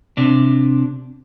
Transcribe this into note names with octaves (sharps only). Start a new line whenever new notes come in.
C3 D4